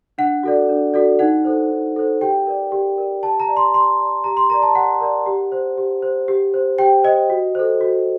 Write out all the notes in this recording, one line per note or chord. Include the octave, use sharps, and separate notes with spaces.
D4 F#5
F#4 A4 D5
D4
F#4 A4 D5
D#4 F#5
A4 C5
D#4
A4 C5
G4 G5
A#4 D5
G4
A#4 D5
G4 A5
A#5
D5
C6
G4 C6
D5
G4 A#5
C6
A#4 D5 A#5
A5
G4 F#5
A#4 D5
G4
C5
G4
C5
G4
C5
G4 G5
C5 D#5
F#4
A4 C5
F#4